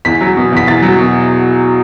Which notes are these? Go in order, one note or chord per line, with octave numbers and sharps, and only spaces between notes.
E2 B6
F#3
B2
E2 B6
E2 A6
F#3
B2